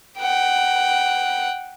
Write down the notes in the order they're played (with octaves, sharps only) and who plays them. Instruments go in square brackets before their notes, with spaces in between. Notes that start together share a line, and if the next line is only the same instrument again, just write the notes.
[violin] F#5 G5